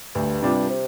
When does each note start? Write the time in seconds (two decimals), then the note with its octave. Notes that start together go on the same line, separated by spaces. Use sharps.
0.15 D2 G2
0.42 C3 G3 D4 F4
0.70 C3